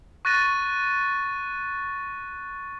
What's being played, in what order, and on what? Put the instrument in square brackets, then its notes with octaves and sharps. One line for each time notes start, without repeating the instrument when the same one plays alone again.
[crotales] C#6 F#6 A6 A#6 D#7